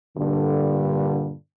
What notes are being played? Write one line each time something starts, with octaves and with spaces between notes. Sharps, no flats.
G2 A#2 D3